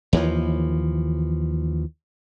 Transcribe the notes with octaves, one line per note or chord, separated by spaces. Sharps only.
D#2 E3 F3